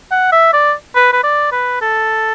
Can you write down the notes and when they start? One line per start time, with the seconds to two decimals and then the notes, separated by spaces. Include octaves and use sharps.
0.11 F#5
0.32 E5
0.53 D5
0.95 B4
1.13 B4
1.23 D5
1.52 B4
1.81 A4